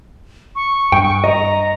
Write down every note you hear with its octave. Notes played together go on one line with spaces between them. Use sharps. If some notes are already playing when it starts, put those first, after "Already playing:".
C#6
G2 G5
D#5 A#5